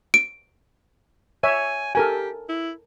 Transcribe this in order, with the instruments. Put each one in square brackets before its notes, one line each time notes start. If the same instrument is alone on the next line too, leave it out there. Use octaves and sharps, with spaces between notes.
[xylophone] D7
[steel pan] C#5 E5 [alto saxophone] G#5
[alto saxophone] G4 [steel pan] A4 A#4 G#5
[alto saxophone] E4